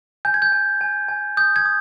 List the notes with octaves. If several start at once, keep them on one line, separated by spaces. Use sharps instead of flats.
G#5 G6
G#6
G6
G#5
G#5
G#5
D#6 G6
G#6
D#6